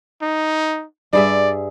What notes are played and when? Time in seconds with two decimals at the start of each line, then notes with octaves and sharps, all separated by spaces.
0.22 D#4
1.13 G2 G#4 D5 E5